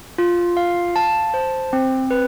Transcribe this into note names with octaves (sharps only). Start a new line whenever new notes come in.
F4
F5
A5
C5
C4
B4